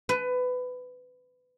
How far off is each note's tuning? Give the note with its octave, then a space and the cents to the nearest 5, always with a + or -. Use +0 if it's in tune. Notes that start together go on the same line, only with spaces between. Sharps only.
B4 +20